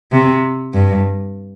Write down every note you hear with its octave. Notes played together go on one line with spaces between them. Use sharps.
C3
G2